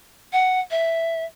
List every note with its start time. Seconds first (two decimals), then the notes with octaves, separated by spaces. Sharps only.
0.33 F#5
0.71 E5